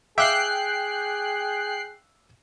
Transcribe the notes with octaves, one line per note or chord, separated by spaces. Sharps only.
G#4 E5 F5 G5 D6 F#6 C7